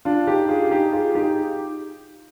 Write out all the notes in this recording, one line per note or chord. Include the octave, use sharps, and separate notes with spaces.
D4 F4
D#4 G4
F4 G#4
D#4 G4
F4 G#4
D#4 G4